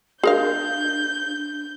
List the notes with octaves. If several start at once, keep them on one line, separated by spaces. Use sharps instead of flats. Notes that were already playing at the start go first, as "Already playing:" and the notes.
D4 G#4 A#4 F5 G6